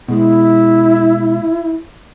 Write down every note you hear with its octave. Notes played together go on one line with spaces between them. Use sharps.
B2 G#3 E4